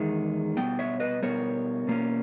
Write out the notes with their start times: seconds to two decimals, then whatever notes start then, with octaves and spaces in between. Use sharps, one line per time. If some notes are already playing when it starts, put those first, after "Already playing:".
Already playing: E2 D#3 G#3 E5
0.57 B2 G3 B3 G5
0.79 C#5 E5
1.00 B4 D#5
1.23 B2 G3 B3 A#4 C#5
1.88 B2 A#3 C#4